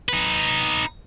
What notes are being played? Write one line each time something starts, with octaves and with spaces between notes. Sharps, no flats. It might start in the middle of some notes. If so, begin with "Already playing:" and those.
D#4 B4